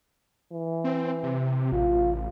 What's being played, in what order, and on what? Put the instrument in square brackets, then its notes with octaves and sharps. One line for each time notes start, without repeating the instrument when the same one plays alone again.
[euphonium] E3
[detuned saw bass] C4
C3
[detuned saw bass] A1 [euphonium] F4